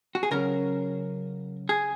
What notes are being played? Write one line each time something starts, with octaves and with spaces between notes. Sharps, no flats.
F#4
G#4
C#3 F#3 C#4 A#4
G#4